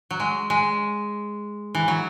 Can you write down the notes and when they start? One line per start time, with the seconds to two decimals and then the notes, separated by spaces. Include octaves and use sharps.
0.11 F#3
0.20 G#3
0.50 G#3
1.75 E3
1.88 F#3